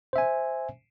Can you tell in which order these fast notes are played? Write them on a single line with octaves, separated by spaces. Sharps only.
C5 E5 G#5